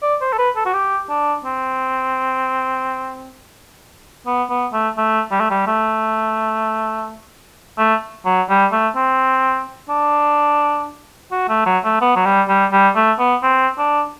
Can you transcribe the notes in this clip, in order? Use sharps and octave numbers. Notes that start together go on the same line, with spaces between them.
D5
C5
A4
B4
A4
F#4
G4
D4
C4
B3
B3
A3
A3
G3
A3
G3
A3
A3
F#3
G3
A3
C4
D4
F#4
A3
F#3
A3
B3
F#3
G3
G3
G3
A3
B3
C4
D4